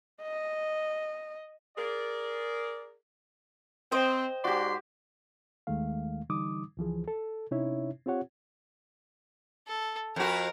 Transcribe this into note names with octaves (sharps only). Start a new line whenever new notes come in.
D#5
G#4 A#4 D5
C4 C5 D#5 G5
G#2 F#4 G4 D5 C6
D#2 D#3 G#3 A3 F5
D3 E3 G3 D#4 D6 D#6
C#2 E3 F3 G#4
A4
C3 C#4 D#4 E4 C#5 E5
C4 F4 G4 C#5 F#5
A4
F2 F#4 A#4